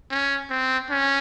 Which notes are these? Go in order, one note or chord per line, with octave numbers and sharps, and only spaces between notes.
C#4
C4
C#4